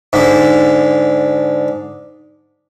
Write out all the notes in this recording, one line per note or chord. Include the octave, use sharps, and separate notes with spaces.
G#2 D3